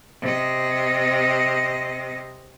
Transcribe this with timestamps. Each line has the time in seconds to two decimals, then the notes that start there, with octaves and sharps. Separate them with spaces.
0.21 C3 D#5